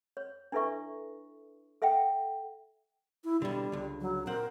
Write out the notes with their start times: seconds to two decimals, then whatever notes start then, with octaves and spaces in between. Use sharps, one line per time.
0.17 C#5
0.52 D4 E4 A4 B4 E5 C#6
1.82 A4 E5 F#5 G5
3.24 E4
3.42 B2 D3 G3
3.72 C#2 D3
4.01 F#3
4.27 A#2 C4 A#4 F#5